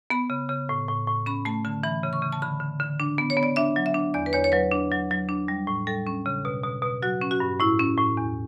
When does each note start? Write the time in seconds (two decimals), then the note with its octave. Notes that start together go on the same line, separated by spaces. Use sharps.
0.10 B3 B5
0.30 C#3
0.49 C#3
0.69 A2
0.88 A2
1.07 A2
1.26 C#4 B5
1.45 A3 A5
1.65 D3 A5
1.83 E3 B5
2.03 C#3
2.13 C#6
2.22 C#3
2.32 A5
2.42 D3 B5
2.60 D3
2.80 D3
3.00 D4
3.18 B3
3.30 C#5
3.37 B3
3.43 D5
3.56 D4 E5
3.76 F#3
3.86 E5
3.94 D4
4.14 E2 D5
4.26 B4
4.33 E2 C#5
4.44 C#5
4.52 F#3 B4
4.72 D4
4.92 F#3
5.11 F#3
5.29 D4
5.48 G3
5.67 A2
5.87 G3 A4
6.07 C#4
6.26 C#3
6.45 B2
6.63 B2
6.82 B2
7.02 F#3 F#4
7.21 C#4
7.31 F#4
7.40 G2
7.59 A2 E4
7.80 C#4
7.98 A2
8.17 E2